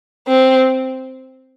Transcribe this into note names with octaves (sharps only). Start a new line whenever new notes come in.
C4